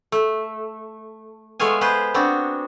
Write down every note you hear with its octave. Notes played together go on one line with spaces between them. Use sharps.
A3
G#3 A3 B3 C#5 F5 G#5
B3 G#4 B4 C5
B3 C4 D4 F#4